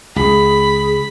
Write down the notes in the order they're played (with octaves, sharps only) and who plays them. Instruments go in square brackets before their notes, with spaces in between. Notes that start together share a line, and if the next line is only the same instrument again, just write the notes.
[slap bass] C#2 [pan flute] G#4 [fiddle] B5